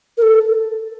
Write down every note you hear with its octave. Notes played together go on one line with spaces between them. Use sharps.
A#4
A4